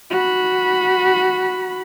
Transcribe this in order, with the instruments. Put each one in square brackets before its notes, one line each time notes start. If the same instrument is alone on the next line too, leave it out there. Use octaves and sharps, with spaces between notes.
[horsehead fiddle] F#4 B5